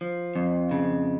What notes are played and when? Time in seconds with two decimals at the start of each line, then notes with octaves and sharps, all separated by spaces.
0.01 F3
0.36 F2
0.71 C#3